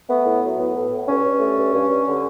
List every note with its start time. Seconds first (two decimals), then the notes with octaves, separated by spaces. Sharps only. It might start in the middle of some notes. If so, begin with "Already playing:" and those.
0.09 A3 B3
0.25 A2
0.42 F#3
0.58 A2 B3
0.75 A2
0.91 A2
1.08 G2 C#4
1.23 G2
1.40 A3
1.57 G2
1.74 G2
1.89 G2
2.06 D3